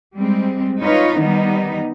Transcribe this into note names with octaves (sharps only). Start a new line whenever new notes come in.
G3 G#3 C4
D#4 F4 B4 C#5
D#3 G3 B3 D#4